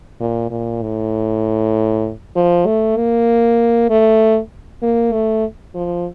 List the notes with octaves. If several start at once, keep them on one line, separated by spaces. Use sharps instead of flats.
A#2
A#2
A2
F3
A3
A#3
A3
A#3
A3
F3